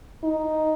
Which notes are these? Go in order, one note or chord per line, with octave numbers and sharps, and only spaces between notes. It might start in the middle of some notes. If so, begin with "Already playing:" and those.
D#4